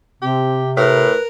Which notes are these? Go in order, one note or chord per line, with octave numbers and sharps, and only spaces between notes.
C3 C4 G4
A2 A#4 B4